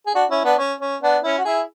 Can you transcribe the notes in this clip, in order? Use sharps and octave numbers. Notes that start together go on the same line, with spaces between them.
G#4
D4 F#4
C#4 E4
B3 D4
C#4
C#4
B3 D4
C#4 E4
F#4
E4 G#4